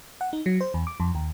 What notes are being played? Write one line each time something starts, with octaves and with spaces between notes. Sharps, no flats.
F#5
D#4
F#3
C5
E2
D6
F2
D#2